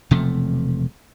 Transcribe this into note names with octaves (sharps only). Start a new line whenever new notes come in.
E1 C3 F3 A3